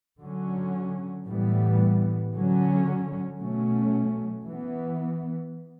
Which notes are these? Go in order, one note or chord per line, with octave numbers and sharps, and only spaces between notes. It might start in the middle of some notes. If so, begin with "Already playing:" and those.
D3 F#3 C#4
A2 E3 G3 B3
D3 F#3 C#4
B2 F#3 A3 C#4
E3 B3